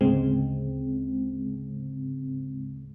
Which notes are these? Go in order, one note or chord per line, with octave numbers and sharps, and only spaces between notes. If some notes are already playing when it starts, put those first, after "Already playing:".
D2 G#2 C#3 G#3 C4